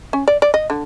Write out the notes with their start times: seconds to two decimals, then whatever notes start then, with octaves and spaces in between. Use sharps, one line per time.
0.13 C#4
0.28 D5
0.42 D5
0.54 D#5
0.70 D3